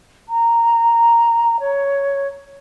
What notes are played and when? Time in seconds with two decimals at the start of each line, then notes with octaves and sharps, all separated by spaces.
0.28 A#5
1.60 C#5